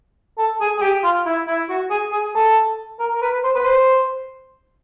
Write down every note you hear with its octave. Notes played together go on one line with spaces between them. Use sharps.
A4
G#4
G#4
G4
F4
E4
E4
F#4
G#4
G#4
A4
A#4
A#4
B4
C5
B4
C5